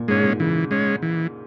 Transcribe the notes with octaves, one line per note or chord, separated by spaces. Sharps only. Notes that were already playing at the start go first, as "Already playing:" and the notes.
Already playing: A#2
G#2 G#3 C#4
A#2
C#3 E3
G#3 C#4
E3